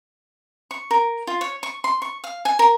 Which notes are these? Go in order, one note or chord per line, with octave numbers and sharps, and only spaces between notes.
C#6
A#4
F4
C#5
C#6
C6
C#6
F5
G#5
A#4